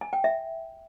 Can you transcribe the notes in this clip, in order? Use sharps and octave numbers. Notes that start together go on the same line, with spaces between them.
G#5
G5
E5